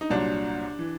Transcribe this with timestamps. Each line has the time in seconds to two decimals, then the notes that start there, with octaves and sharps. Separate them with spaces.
0.01 D#4
0.10 C2 A#2 F#3 D4
0.79 E3